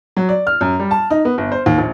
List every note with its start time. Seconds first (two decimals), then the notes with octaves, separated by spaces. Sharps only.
0.16 F#3
0.29 D5
0.47 F6
0.61 F#2
0.79 G3
0.91 A5
1.10 D#4
1.25 B3
1.38 G1
1.52 C5
1.66 D#2
1.78 A#1